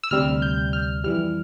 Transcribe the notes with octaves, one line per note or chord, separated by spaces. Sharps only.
E6
D2 C3 G3 F6
G6
F6
F2 E3 G3 F6